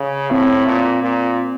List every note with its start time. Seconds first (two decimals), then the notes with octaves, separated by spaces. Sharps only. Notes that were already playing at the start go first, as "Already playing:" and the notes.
Already playing: C#3
0.31 A2 C4
0.67 A#2
1.03 A#2